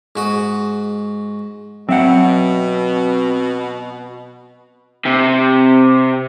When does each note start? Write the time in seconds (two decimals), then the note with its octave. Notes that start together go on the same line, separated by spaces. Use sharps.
0.16 G#2 F#4 D#6
1.89 B2 F#3 C4 E5 F#5
5.06 C3